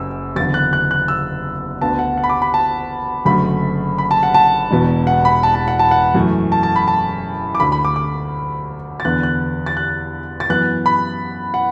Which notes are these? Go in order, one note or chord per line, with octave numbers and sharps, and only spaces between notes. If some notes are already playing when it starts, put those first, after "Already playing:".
Already playing: F#1 F#2 E6
F#1 E2 D3 A6
F#6
F#6
F#6
E6
D2 D3 B3 A5
F#5
F#5
B5
D6
B5
A5
F#1 F#2 D3 A3 B5
B5
A5
F#5
A5
E1 E2 B2 B3
F#5
B5
A5
A5
F#5
A5
F#5
F#2 E3 A3
A5
A5
B5
A5
D6
D2 D3 A3 B5
B5
D6
D6
A6
E2 D3 B3 F#6
F#6
A6
F#6
A6
F#2 E3 B3 F#6
B5
F#5